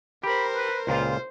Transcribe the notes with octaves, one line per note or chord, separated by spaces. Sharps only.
G4 A#4 C5 B5
B4
C#2 A#2 F4 C5